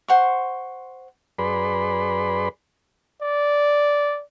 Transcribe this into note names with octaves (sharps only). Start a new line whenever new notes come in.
C5 F#5 C6 C#6
F#2 G#4 B4 D5 B5 C6
D5